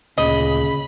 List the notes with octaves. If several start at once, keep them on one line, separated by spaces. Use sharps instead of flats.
D2 A#2 C#3 D#5 B5